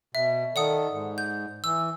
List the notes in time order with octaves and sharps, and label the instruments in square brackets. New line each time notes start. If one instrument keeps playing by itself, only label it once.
[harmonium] B2 [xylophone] E5
[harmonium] D#3 A4 [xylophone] D5 F#5 D#6
[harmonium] G#2
[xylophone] G6
[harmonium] E3 [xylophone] E6